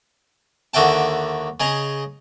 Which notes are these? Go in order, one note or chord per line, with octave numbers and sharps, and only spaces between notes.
D#2 D3 F#4 E5 G5 A5
C#3 G#4 D#5 A#5